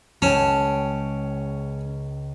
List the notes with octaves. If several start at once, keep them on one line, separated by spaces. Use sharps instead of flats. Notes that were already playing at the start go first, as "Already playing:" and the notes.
C#2 C#4 G5 A5